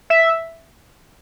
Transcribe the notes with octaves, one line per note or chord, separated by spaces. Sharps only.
E5